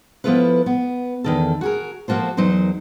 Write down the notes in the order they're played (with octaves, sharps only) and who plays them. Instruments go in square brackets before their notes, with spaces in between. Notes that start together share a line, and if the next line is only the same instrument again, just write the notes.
[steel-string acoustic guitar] F3 B3 E4 F4 A4 B4
B3
E2 D#3 A4
F#4 G#4 A#4
F3 A#3 F#4 A4 C5
E2 F#3 D#4 A#4 C5